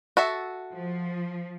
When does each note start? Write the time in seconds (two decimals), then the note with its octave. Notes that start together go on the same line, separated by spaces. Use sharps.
0.17 F#4 A4 E5
0.73 F3